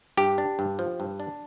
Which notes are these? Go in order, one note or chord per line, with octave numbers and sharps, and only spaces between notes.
G2 G4
D4
G2
F3
G2
D4